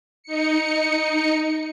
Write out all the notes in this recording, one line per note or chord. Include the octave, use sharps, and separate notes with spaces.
D#4 C#7